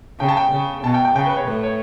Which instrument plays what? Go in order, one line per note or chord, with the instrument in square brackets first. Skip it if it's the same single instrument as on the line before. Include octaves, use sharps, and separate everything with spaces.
[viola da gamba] C#3 [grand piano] G5
[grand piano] A5
G5
[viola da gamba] C#3
[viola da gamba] B2 [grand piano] A5
[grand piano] G5
G5
[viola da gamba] C#3 [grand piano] G5
[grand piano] B4
C#5
[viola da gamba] A2 [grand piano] B4
[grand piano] C#5